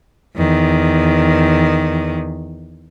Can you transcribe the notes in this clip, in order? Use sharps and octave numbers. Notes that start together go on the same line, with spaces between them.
E2 D#3